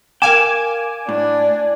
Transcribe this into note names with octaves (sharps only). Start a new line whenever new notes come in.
A#4 F5 G5 G#5 D6 E7
A2 D4